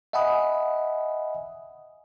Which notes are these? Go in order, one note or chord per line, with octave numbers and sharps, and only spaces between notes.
D#5 E5 F#5 G#5 B5 D#6